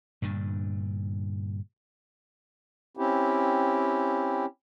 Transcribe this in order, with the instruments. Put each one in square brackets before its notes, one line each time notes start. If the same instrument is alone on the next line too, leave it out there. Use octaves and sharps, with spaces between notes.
[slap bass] G2 A#2 D3
[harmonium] C4 C#4 E4 G4